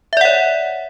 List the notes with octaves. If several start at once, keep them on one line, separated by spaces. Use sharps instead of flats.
C#5 D5 E5 F#5